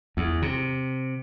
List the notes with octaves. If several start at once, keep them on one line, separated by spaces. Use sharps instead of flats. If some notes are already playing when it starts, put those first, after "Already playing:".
E2
C3